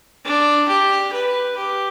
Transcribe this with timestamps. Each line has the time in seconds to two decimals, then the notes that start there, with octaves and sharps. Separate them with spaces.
0.25 D4
0.68 G4
1.12 B4
1.57 G4